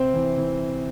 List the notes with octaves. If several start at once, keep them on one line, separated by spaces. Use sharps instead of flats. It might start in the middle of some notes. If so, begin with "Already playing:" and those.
Already playing: C3 C4 C5
E3
E3